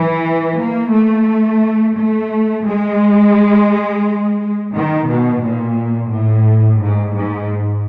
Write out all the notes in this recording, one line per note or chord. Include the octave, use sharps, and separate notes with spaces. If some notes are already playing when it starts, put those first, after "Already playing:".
Already playing: E3
A#3
A3
A3
G#3
D#3
B2
A#2
A2
G#2
G#2